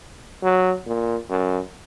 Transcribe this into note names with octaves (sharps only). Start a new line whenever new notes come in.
F#3
A#2
F#2